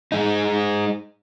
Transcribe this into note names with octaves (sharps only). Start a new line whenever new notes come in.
G#3 D#4